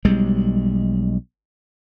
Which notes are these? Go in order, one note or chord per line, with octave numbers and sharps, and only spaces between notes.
B1 G3 G#3